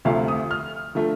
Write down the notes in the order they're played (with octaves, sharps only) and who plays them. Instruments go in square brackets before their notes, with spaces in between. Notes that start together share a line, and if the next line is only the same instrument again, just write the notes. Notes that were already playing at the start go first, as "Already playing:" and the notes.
[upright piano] D2 C3 F3 A3 F5
D#6
F6
D3 F3 A3